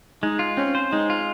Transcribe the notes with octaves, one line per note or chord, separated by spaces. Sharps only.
G#3 D#4
F4
C4 C#4
C5
G#3 D#4
F4